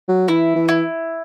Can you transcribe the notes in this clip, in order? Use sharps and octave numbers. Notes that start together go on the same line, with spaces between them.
F#3
E3 E4
E3
E4